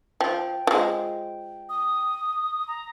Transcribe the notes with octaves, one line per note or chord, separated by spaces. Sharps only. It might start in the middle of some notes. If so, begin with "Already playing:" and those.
F3 G5
F3 G#3
D#6
A#5